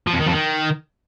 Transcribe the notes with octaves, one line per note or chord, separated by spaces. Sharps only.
F3
F2
D#3
F2
D#3